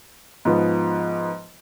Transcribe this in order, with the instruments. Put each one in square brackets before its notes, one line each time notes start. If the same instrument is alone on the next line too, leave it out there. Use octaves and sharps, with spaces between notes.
[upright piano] G#2 F3 B3